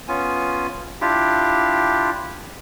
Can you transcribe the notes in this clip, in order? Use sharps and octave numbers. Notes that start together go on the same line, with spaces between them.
B3 C#4 F4 G#5
D4 E4 F4 G4